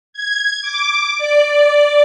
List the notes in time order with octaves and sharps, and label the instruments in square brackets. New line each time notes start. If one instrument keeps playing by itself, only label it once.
[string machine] G#6
D6
D5